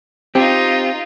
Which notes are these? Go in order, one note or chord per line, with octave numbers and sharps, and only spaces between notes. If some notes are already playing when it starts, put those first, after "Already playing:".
C4 D#4 F4 G4